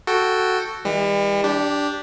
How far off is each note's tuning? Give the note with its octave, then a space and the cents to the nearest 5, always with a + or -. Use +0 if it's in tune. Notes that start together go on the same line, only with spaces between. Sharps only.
F#4 +0 A4 +0 G5 +0
E3 -35 G3 +40
D4 -10 G4 +0